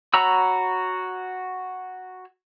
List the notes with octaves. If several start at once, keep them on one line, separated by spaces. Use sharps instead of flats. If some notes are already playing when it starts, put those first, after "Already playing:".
F#4 C#5 A#5 B5 E6